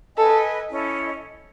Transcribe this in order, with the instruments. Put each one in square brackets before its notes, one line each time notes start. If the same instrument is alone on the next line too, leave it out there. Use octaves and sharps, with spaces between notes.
[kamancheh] A4 [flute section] B4 D#5 G#5
[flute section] C#4 E4 A4 D#5